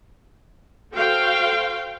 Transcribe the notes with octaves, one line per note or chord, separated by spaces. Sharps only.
F#4 A4 C5 F5 G5